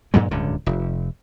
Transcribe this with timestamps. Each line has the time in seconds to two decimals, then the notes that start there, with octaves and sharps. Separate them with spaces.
0.14 G2 A#2 F#3 G#3
0.31 D1 C#2 G2 D3
0.66 F1